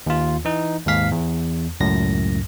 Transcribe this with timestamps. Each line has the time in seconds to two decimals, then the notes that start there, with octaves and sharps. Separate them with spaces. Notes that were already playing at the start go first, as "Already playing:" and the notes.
0.06 D#2 F4
0.45 E3 D#4
0.87 D#2 G#2 F5 B6
1.12 E2
1.80 C#2 F#2 A2 A#6